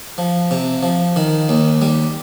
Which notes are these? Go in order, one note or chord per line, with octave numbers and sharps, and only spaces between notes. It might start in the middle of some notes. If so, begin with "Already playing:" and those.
F3
C3
F3
D#3
D#2
G3